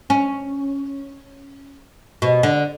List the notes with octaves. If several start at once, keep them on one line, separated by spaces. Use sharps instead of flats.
C#4
B2
D3